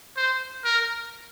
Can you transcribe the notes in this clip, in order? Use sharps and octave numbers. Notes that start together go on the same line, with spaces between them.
C5
A#4